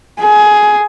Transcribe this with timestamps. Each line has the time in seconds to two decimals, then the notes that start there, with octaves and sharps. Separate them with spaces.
0.20 G#4